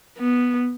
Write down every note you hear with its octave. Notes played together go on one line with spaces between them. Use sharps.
B3